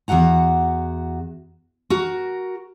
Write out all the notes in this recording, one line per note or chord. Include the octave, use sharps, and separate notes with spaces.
E2 G#2 F#4 F#5 A#5
F#4 A#4